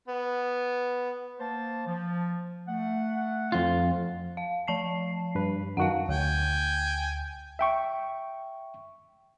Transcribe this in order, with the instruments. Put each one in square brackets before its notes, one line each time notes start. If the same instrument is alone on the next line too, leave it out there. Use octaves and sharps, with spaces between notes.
[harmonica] B3
[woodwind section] A#3 C5 A5
F3
A3 F#5
[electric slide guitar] F2 F4
[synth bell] F5
F3 A5 C7
[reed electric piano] G2 B4
[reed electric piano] F#2 D#3 F#4 [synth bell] F5 F#5
[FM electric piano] D2 [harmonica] G5 G#5
[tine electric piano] E5 G5 C#6